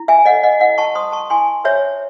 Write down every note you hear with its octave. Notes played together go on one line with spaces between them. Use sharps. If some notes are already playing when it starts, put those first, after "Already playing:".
Already playing: E4
E5 G#5
A4 C#5 D#5 F#5
D#5 F#5
E4 D#5 F#5
A5 C#6
C5 C6 D#6
A5 C#6
E4 G#5 C6
C5 C#5 E5